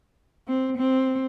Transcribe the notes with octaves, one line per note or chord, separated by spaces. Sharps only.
C4
C4